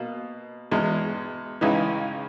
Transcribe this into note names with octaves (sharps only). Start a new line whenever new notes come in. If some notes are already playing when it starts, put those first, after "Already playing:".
Already playing: B2 A#3
E2 B2 G#3
C#2 C#3 E3 D#4